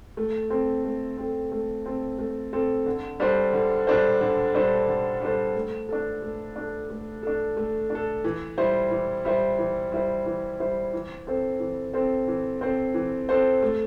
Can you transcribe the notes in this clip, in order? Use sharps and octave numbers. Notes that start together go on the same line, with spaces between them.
A3
C4 A4
A3
C4 A4
A3
C4 A4
A3
C4 A4
D3
G3 D4 A4 C5
D3
G3 D4 A4 C5
D3
G3 D4 A4 C5
D3
G3 D4 A4 C5
A3
D4 A4
A3
D4 A4
A3
D4 A4
A3
D4
A4
E3
G3 E4 C5
E3
G3 E4 C5
E3
G3 E4 C5
E3
G3 E4 C5
E3
C4 A4 C5
E3
C4 A4 C5
E3
C4 A4 C5
E3
C4 A4 C5
A3